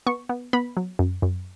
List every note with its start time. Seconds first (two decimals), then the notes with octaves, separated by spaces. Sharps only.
0.07 B3 C#6
0.29 B3
0.53 B3 B5
0.77 F#3
0.99 F#2
1.22 F#2